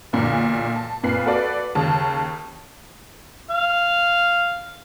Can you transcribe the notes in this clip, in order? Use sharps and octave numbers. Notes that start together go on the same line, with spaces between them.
B1 E2 A#2 D3
A5
F2 A#2 B4 C7
F#4 A4 B4 D5
D#2 C#3 A5
F5